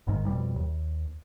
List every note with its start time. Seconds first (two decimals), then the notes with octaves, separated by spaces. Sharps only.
0.07 G1 G#2 C3 D#3
0.26 F2 B2 G3
0.56 D#2